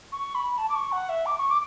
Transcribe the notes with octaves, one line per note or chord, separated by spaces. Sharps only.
C#6
B5
A5
D6
C#6
F#5
E5
D6
C#6
D6